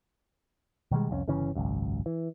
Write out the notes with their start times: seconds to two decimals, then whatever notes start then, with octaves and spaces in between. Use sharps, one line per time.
0.91 B2 D#3 G3 G#3
1.10 C2 F2 C4 C#4
1.28 G1 C#3 E3 C#4
1.55 G#1 C#2 F#2
2.06 E3